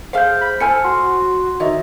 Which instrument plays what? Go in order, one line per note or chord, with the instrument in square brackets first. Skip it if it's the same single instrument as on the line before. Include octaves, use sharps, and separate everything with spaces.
[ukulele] G#4 E5 F5 [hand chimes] C5 F6 G6
[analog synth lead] B5
[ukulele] E4 C5 G#5 [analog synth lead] A4 [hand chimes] F6 C#7
[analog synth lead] F#4 [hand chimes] C6
[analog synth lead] D#3 [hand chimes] F#4 D#5 E5 [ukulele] C#5